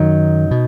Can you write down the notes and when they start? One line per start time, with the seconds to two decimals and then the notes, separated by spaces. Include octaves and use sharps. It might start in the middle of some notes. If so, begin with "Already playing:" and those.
Already playing: F#2 D#3 F#3 D#4
0.51 B2